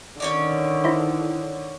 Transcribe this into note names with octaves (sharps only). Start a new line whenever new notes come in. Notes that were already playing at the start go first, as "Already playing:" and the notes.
D3 D#3 C#4 C#5 D5
D#4 E4 C5